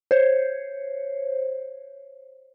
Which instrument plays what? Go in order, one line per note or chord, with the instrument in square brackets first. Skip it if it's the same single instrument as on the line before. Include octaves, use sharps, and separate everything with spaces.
[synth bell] C5 C#5